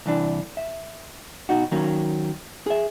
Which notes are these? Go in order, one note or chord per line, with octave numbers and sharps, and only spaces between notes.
C2 E3 D4
E5
B2 D#4 F#4
D#3 F#3 A#3 C#4
G#4 E5